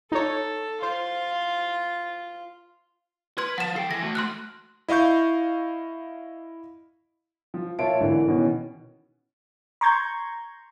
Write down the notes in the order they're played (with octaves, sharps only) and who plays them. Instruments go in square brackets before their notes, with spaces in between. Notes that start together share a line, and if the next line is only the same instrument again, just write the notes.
[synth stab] D#4 C#5 [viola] A4
[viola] F4 [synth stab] C5
[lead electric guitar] B4 [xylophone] C6 F6 G#6
[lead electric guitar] F3 [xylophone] F#5 E7
[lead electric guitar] A4 G5 [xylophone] C7
[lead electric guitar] E3 [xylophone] A#6
[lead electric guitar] A3 F#4
[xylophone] C6 F6 F#6
[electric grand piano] E4 D#5 F5 C#6 G6
[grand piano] F3
A#2 F4 C#5 E5 A5 D7
G#1 D3 E3
B2 D#3 E3 C#4
[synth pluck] A#5 C6 C#6 G6 G#6